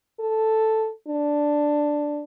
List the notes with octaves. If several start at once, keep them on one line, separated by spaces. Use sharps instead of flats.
A4
D4